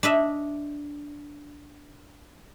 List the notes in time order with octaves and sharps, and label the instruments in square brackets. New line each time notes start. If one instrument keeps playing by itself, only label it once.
[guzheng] D4 D#5 E5